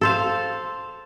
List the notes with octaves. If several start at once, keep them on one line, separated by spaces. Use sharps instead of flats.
A4 C5 F5